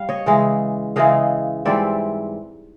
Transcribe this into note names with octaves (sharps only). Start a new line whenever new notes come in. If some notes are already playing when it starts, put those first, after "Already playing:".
Already playing: G3 F5
C#5 D#5
C#3 E3 G#3
C#3 E3 G#3 D#5 F5
G#2 E3 G3 C4 D5 E5